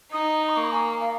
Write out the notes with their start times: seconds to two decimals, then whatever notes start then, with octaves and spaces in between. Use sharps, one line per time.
0.12 D#4 D#6
0.42 A#5
0.49 D#6
0.57 A#3 C#6
0.64 A#5
0.72 G#5
1.01 F5